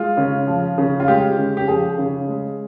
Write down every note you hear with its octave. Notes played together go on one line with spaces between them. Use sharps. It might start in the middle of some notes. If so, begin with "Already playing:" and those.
Already playing: G#3 F4
C#3
F3
C#3
F4
G#3 G4
C#3
G4
F3 G#4
C#3
G#3